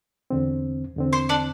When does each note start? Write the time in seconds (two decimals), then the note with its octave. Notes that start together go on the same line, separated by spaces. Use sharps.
0.30 E2 D3 C4
0.96 E2 D3 C4
1.13 C5 C6
1.29 D4 D5